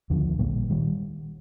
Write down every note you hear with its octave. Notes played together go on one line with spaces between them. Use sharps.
D#2 D3 F3
A#1 A#2 G3 A#3
D#3 G3